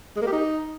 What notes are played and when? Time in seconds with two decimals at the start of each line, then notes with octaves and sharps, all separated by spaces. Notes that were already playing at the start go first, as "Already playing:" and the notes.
0.16 G#3
0.22 A#3
0.27 G4
0.32 D#4